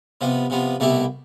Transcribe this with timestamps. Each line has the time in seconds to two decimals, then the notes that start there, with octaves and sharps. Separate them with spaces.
0.21 C3 F3 B3
0.50 C3 F3 B3
0.80 C2 B2 A3 E4 G4